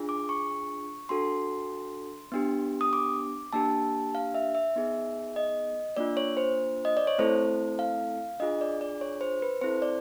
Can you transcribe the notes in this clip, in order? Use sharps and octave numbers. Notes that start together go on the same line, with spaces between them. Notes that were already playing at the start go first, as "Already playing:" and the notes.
Already playing: D4 F4 G#4
D6
C#6
D4 F#4 A4 C6
B3 D4 G4
D#6
D6
A#3 D4 G4 A5
F5
E5
E5
B3 D#4 G#4
D#5
A#3 D4 F4 D5
C#5
C5
D#5
D5
C#5
A3 C4 E4 A4 C5
F5
D4 F4 G#4 D#5
D5
D5
C#5
C5
B4
C4 E4 A4 C5
D5